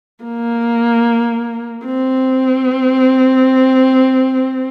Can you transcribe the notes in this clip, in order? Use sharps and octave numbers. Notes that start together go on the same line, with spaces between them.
A#3
C4